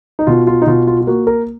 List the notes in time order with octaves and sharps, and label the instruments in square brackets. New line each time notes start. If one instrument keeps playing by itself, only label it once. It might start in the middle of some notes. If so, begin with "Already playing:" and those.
[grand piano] D#4
B2 F4
F4
D#4
B2 F4
F4
F4
A#3 F#4
A#4